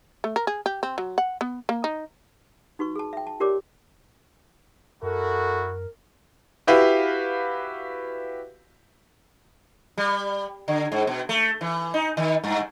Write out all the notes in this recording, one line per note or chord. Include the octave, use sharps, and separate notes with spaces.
A3
A#4
G#4
G4
C4
F#3
F#5
B3
A#3
D#4
D#4 F#4 B4 C#6
G#4 A5
E5 G5
A5
F4 G4 A#4 C#5 D5 D6
F#2 E4 F#4 A4 A#4
E4 F#4 G4 B4 E5 F5
G3
D3
G#2
B2
A3
E3
D#4
D#3
G2